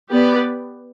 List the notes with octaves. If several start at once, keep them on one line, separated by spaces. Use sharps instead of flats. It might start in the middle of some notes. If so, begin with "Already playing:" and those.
B3 G4 B4 D5